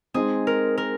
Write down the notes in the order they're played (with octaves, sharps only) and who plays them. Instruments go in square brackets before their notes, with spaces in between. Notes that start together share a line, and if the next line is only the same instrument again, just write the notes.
[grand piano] G#3 C4 D#4 [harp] G#4
[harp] A#4
A#4